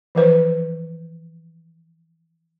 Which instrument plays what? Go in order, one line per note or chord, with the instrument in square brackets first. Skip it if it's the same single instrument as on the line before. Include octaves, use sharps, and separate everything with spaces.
[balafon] E3 F3 B4 C5